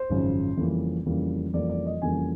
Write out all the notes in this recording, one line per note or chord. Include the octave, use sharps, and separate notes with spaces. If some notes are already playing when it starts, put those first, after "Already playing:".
Already playing: C5
G#1 F#2 C#3 F3
F2 C#3 E3 G3 A#3
F2 C#3 E3 G3 A#3
F2 C#3 E3 G3 A#3 D5
D5
D#5
F2 C#3 E3 G3 A#3 G#5